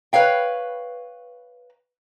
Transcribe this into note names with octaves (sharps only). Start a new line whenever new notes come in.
B4 C#5 F5 G5